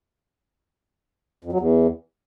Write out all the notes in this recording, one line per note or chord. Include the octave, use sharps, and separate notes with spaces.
F2
F#3
E2